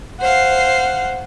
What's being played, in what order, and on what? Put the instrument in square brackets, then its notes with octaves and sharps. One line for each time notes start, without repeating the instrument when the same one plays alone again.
[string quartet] C5 F5 [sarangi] F#5